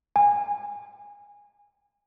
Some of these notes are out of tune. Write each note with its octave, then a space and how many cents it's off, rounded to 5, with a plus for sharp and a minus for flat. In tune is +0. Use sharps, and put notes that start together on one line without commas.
G#5 -20